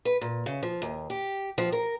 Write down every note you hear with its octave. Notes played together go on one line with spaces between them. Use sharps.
B4
A#2
C#3
F3
D#2
G4
F3
A#4